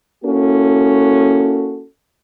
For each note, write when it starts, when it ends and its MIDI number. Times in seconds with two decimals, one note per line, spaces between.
0.24 1.83 58
0.24 1.83 61
0.24 1.83 64
0.24 1.83 66
0.24 1.83 69